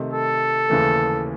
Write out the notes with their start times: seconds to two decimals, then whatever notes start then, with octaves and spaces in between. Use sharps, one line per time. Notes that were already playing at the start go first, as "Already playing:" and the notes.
Already playing: C3 D#3 A3 D#4
0.14 A4
0.69 D#2 C#3 E3 A3